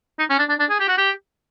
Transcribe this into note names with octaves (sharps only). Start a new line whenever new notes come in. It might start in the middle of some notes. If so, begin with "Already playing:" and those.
D#4
C#4
D4
D4
D4
G#4
G4
F#4
G4